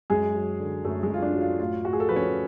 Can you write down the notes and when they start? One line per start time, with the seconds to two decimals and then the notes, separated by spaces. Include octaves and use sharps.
0.10 F#2 G#3 G#4
0.35 F#3
0.59 D3
0.84 F#2 A3 A4
1.03 G#3 G#4
1.09 F#2 F4
1.22 D4
1.35 F#3
1.41 F4
1.59 A2 F4
1.85 A2 F#4
1.93 G#4
2.00 A4
2.09 F3 B4
2.16 C#4 C#5